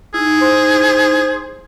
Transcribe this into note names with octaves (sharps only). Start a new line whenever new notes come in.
D#4 E4 G#4
C5